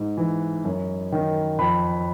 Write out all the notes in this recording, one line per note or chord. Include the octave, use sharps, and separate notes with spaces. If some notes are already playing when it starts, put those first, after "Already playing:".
Already playing: G#2
E3
F#2
D#3
F2 B5